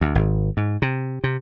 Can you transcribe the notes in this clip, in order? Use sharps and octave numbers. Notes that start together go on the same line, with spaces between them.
D2
G#1
G#2
C3
C3